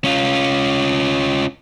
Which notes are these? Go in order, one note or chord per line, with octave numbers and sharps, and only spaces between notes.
C#4 F4